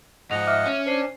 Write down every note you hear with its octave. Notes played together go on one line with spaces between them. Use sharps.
G#2 F3 D#5 F#5 F7
E5 D6 F6
C#4
D4 C5 C7